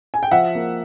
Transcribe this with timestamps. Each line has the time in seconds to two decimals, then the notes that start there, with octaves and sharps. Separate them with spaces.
0.14 G#5
0.23 G5
0.31 F3 E5 F#5
0.55 A#3